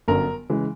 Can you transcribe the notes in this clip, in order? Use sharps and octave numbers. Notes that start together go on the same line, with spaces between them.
G1 F#2 D3 A#4
C#3 E3 G#3